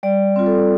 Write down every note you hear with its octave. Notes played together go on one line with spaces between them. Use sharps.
G3 D5
C4 F4
A4